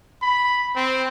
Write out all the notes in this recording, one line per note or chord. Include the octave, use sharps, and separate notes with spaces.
B5
C4